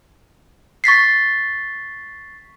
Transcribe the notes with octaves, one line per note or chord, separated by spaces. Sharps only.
C#6 A6 B6 C7